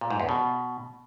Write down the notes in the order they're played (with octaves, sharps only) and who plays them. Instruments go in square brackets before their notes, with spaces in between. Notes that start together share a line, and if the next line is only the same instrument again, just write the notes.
[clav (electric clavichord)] A#2
G#2
E2
B2